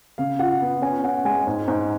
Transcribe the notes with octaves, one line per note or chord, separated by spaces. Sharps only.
C#3 F5
F4 F#5
B3
C#4 G#5
C#4 F#5
G#3 G#5
G#2
G#2